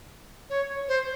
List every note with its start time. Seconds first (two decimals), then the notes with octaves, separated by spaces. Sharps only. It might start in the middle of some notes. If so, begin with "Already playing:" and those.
0.50 C#5
0.88 C5